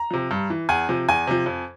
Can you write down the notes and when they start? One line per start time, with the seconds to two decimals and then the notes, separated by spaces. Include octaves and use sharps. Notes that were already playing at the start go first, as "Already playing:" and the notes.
Already playing: A#5
0.11 C3 F3
0.31 G2
0.50 E3
0.69 E2 G#5
0.89 C3 F3
1.08 E2 G#5
1.27 C3 F3
1.46 F2